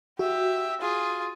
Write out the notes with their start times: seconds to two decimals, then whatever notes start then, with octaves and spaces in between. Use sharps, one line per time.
0.19 F#4 G4 E5
0.81 F4 G#4